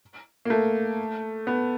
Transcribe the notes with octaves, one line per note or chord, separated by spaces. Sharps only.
A#3
A3
B3